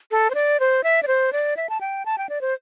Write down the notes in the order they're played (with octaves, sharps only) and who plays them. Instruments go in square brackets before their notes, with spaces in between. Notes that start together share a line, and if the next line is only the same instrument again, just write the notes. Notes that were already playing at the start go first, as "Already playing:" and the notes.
[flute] A4
C5
D5
C5
E5
D5
C5
D5
E5
A5
G5
A5
G5
D5
C5